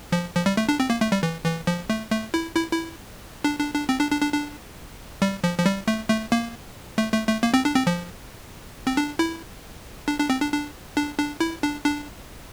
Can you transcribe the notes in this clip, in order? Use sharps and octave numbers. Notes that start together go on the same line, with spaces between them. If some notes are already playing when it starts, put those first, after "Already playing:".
F3
F3
G3
A3
D4
C4
A#3
A3
G3
E3
E3
F3
A3
A3
E4
E4
E4
D4
D4
D4
C4
D4
D4
D4
D4
G3
F3
F3
G3
A3
A3
A#3
A3
A3
A3
A#3
C4
D4
C4
F3
C4
D4
E4
D4
D4
C4
D4
D4
D4
D4
E4
D4
D4